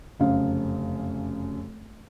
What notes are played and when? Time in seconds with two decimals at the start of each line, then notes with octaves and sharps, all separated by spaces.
0.19 F1 F#2 C#3 F5